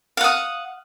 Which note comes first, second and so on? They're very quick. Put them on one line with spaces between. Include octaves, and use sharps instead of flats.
F5 F#5 D#6